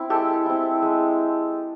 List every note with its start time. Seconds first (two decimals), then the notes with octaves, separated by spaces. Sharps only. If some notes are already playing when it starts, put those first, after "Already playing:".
Already playing: C4 E4
0.10 G#3 G4 A4
0.46 C4 E4
0.82 G#3